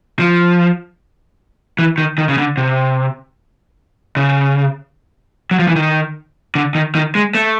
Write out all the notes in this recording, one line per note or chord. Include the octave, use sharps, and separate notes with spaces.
F3
E3
D#3
D#3
C#3
D3
C3
C#3
F#3
F3
E3
D#3
D3
D#3
D#3
G#3
A3